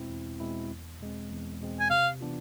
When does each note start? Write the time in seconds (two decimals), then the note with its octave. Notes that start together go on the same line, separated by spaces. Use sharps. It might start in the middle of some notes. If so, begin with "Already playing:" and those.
Already playing: E2 B2 G#3 C4 E4
0.10 E2
0.40 B2 G#3 C4 E4
0.71 E2
1.00 B2 G#3 C4
1.30 E2
1.60 B2 G#3 C4
1.80 G#5
1.90 C3 F5
2.20 E3 B3 D4 F4